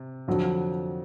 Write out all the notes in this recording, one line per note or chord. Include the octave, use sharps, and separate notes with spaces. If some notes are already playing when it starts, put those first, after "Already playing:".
Already playing: C3
F2 D3 F#3